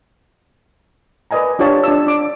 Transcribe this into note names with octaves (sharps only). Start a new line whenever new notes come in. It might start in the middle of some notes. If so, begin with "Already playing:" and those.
A#4 B4 D5 D#5 G#5 A#5
D4 F4 G4 C#5 A5
D4 A5 E6
D4 D6